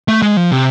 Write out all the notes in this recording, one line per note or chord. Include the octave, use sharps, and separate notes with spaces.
A3
G#3
F3
C3